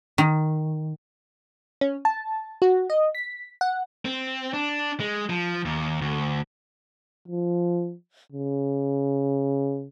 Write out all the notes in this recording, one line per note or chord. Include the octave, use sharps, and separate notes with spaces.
D#3
C#4
A5
F#4
D#5
B6
F#5
C4
D4
G#3
F3
D#2
D2
F3
C#3